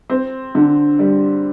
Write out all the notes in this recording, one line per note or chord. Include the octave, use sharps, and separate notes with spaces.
C4
D3
G3